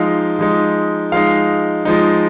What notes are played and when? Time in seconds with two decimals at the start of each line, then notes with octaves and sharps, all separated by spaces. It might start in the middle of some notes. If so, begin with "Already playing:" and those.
Already playing: F3 G#3 D#4 F5
0.39 F3 G#3 D#4
1.12 F3 G#3 D#4 F5
1.85 F3 G#3 D#4